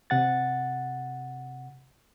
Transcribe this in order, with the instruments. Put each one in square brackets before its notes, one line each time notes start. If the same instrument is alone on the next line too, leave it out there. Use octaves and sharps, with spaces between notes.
[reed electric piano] C3 F#5 A6